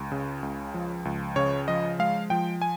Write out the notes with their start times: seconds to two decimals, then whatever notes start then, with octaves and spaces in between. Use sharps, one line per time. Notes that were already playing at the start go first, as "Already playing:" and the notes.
Already playing: C#2
0.12 C#3
0.43 C#2
0.74 F3
1.05 C#2
1.36 C#3 C#5
1.68 F3 D#5
1.99 G#3 F5
2.30 F3 G5
2.62 G#5